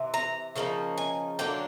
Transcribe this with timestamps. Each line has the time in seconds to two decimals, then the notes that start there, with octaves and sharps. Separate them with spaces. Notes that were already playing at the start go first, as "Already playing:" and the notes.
Already playing: C3 E3
0.14 A#5
0.56 C#3 F3 A#3 D#4
0.98 G#5
1.39 D3 F#3 A#3 D4 G5